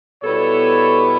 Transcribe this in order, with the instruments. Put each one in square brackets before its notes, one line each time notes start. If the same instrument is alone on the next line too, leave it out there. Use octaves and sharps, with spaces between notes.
[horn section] B2 G3 B3 E4 A4 C#5